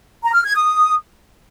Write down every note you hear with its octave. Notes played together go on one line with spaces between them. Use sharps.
A#5
F6
G#6
D#6